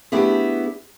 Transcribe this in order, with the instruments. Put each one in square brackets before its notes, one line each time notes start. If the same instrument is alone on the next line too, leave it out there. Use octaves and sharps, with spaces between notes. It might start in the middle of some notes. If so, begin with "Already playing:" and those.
[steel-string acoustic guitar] A3 B3 D4 E4 G4 G#4